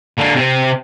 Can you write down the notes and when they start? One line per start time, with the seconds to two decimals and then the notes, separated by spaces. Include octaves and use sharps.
0.18 D3 A#3
0.35 C3 C4